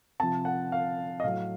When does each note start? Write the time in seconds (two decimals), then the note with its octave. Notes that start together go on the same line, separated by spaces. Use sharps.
0.19 C3 F3 A5
0.45 F#5
0.72 F5
1.20 D#5
1.23 A2 F#3 F5